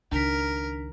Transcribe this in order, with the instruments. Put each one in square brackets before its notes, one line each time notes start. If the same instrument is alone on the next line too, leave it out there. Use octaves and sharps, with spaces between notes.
[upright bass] C#2 D#3 [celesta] D4 B6 [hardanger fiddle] A#4